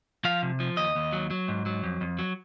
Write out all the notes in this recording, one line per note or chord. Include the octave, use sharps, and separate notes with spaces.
F3 F5
C3
F3
D#2 D#5
D#2
F#3
F#3
G#2
F#3
F2
F2
F#3